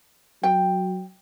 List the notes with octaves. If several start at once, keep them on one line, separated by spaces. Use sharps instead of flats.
F#3 G5